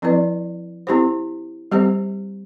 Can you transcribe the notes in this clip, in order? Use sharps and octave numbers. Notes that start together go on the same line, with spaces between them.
F3 C4 E4 B4 D5
C4 E4 G4 C5
G3 C4 G4 C5